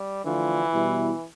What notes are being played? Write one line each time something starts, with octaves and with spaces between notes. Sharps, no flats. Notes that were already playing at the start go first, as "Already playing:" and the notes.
Already playing: G3
D3 E3 F3 A3 D4 F4
B2 G3 B3 E4